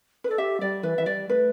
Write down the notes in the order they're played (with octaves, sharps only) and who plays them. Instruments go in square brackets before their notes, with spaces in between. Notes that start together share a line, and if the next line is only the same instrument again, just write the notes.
[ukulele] B4
[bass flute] A4 [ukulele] D5
[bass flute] G4 [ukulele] E5
[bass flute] G3 [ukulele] D5
[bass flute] E3 [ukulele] B4
[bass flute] E3 [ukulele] E5
[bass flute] G3 [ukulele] D5
[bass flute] A3 [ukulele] B4